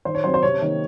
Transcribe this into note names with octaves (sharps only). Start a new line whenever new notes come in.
D#3 C5
C#5
F#3 C4 C5
C5
C3 C#5
D#3 A#3